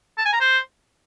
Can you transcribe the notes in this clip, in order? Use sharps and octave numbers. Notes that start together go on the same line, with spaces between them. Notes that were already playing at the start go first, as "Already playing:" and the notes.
A5
G#5
A#5
C5